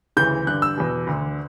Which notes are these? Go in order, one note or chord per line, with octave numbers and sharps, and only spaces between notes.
D2 C#3 E3 G6
G2 D3 F#6
E6
E2 B2
D2 D3